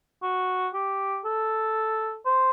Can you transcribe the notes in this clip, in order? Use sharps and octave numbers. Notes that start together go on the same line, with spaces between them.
F#4
G4
A4
C5